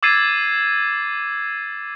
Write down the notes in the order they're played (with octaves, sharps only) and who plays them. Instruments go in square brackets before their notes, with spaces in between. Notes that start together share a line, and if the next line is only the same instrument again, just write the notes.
[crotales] D6 E6 G#6 A6 C7 D#7